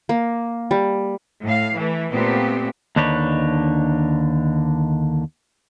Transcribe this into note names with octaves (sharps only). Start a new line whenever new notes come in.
A#3
G3
A2 F5
E3 A3
A#2 A3 B3 C4 G4
D#2 D3 D4 D#4 B4 C#5